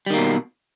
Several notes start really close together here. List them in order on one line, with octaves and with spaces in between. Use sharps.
G3 D#3 A#3 B2